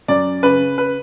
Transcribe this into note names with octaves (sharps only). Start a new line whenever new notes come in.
F#2 D5
C#3 B4
B4